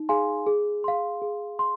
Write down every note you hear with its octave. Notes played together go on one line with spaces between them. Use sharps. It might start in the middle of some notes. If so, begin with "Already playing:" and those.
Already playing: D#4
G#4 F5 G#5 C6
G#4
F5 C6
G#4
C6